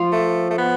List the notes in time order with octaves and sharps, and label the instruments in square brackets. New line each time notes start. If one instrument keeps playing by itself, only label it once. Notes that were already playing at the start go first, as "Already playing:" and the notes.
Already playing: [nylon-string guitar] F3 F4
[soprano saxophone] A3
A3
B3